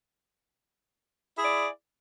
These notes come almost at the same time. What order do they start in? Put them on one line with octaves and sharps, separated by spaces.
E4 G#4 D5